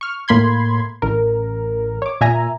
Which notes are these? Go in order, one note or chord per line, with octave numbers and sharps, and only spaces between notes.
C#6 F6
A2 A#3 B5 C6 G#6
A1 A#4
C#5 D6
A#2 E5 G#5 A#5